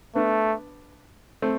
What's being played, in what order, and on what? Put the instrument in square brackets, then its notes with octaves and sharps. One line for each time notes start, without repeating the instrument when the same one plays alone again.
[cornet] A3 [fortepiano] B3 D4
[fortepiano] A3 C4